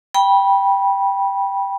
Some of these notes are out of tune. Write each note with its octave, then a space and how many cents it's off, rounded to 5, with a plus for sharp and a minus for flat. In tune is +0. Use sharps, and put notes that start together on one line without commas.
G5 +5 B5 -20